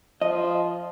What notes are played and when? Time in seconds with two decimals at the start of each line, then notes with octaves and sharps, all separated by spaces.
0.22 F3 D#5